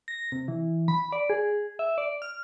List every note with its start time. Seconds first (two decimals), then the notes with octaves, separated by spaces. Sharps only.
0.08 A#6
0.32 C3
0.48 E3
0.88 B5
1.12 D5
1.30 G#4
1.79 E5
1.98 D5
2.22 F6